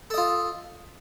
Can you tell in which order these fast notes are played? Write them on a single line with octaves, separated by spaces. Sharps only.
A4 D#5 F4